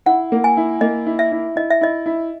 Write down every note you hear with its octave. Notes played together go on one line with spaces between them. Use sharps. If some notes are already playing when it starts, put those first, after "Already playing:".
E4 F#5
A#3
G#5
E4
A#3 D#5
E4
E5
E4
E4 D#5
E5
E4 D#5
E4